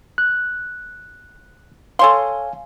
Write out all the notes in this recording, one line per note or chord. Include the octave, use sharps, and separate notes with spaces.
F#6
A4 C#5 F5 G#5 C6